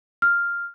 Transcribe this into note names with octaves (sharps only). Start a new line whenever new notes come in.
F6